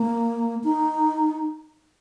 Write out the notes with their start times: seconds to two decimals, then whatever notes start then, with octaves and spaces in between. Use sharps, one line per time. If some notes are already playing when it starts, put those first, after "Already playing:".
Already playing: A#3
0.64 D#4